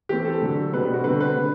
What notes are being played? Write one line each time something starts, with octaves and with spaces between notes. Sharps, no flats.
E3 A3 C4 G4
A4
D3 F#3 A3
B2 G3 C4 B4
G4
F#4
D3 A3 C4 B4
B4
D3 G3